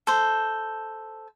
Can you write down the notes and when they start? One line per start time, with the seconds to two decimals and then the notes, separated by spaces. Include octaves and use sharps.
0.07 A4 C5